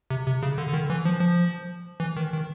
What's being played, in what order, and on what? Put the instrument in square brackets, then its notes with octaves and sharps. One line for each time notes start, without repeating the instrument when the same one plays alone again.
[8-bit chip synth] C3
C3
C#3
D3
D3
D#3
E3
F3
F3
E3
D#3
D#3